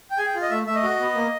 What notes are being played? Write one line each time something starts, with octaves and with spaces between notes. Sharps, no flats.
G5
G#4 G#5
G5
F4
D#5
A3 E5
A3 E5
D#5
F#4
B3
A#3